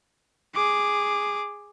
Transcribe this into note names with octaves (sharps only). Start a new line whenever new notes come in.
G#4 D6